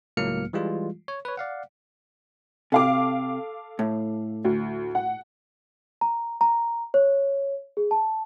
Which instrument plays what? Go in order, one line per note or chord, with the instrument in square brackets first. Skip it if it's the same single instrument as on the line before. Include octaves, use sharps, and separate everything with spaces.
[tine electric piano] C#2 A2 F#3 A#3 F6 C#7
E3 G3 G#3 F4
C#5
B4 C#5
D5 F5 F#5
[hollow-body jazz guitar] C3 [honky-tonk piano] A4 F5 D6
[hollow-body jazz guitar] A2
[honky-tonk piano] D2
F#5
[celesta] A#5
A#5
C#5
G#4
A5